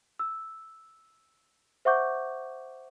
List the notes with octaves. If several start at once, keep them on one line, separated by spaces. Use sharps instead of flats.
E6
C5 E5 F#5 C#6 D6 G6